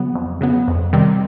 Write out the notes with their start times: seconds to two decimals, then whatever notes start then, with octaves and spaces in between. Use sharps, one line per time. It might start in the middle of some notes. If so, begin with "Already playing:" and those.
Already playing: C#3 F#3 B3
0.15 F2
0.41 C#3 F#3 B3
0.68 F2
0.93 C3 D#3 G3 C4